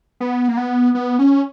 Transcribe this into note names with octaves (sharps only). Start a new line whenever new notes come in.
B3
A#3
B3
B3
C#4